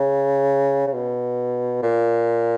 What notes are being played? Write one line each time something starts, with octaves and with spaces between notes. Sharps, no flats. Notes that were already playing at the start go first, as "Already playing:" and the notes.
Already playing: C#3
C#3
B2
A#2